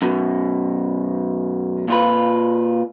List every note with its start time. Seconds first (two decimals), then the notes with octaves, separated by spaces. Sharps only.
0.02 F#2 B2
1.88 A#2 F4 B4